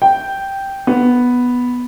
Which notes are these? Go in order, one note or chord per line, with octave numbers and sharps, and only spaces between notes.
G5
B3